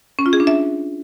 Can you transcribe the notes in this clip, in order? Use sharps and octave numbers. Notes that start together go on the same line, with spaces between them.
C#4
F4
G#4
D4
E5